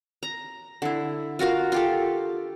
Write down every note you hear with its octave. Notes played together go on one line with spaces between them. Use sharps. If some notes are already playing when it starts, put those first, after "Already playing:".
A#5
D3 E4
F4 F#4 A#4 F5
F4 G4 A4